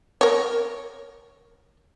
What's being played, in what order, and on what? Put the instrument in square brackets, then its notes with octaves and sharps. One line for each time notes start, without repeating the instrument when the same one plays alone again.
[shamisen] A#4 C#5